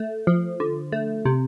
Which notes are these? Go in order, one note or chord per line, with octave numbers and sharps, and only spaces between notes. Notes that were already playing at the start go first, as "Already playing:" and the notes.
Already playing: A3
F3
D3
A3
C3